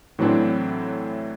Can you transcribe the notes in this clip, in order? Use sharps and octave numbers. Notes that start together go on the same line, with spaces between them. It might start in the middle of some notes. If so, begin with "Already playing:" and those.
A2 E3 F#3 C4 D4